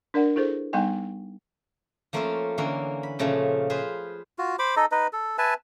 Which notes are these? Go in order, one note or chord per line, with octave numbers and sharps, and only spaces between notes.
D4 A#4 D5 F#5
E4 G#4 A4 C5
G3 B3 D#4 D#5 G5 C#6
F3 A3 A#3 C#4 F4 A4
D3 E3 A#3 C#4
B5
A#2 C#3 F3 A3
F4 G#4 B4 C5
F4 F#4
C5 B5 D6
D#4 A4 D#5
D#4 B4 D#5
A4
B4 E5 G#5 A5